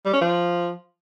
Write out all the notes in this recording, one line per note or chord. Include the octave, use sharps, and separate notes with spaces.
G3
C#4
F3